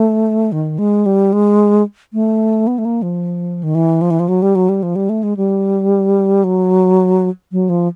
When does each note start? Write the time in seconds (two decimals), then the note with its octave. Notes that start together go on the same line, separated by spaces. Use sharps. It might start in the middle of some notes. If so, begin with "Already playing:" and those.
Already playing: A3
0.52 D#3
0.79 G#3
1.06 G3
1.33 G#3
2.13 A3
2.67 B3
2.78 A3
2.85 A#3
3.02 F3
3.63 D#3
3.75 E3
4.01 F3
4.11 E3
4.20 F3
4.28 F#3
4.42 G3
4.55 F#3
4.69 G3
4.83 F3
4.96 G3
5.09 A3
5.23 G#3
5.37 G3
6.44 F#3
7.52 F#3
7.69 F3